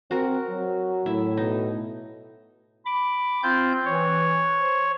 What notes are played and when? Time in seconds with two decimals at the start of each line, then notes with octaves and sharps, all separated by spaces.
0.11 C4 F#4 A#4
0.49 F#3
1.06 A2 E4
1.37 B2 D#4
2.86 B5 D6
3.43 C4 F4 G6
3.85 E3 C#5
4.59 C5